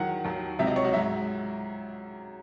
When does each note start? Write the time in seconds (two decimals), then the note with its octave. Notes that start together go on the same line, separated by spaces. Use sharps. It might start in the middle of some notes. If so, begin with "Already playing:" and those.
Already playing: E2 D#3 F#3 F#5
0.24 D#2 D#3 F#3
0.59 C#2 C3 F#3 E5
0.67 D#5
0.76 C#5
0.85 F#4
0.93 G#2 F#3 E5